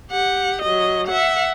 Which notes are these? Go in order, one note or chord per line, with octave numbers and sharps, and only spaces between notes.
G4 F#5
F#3 D#5
E5 F#5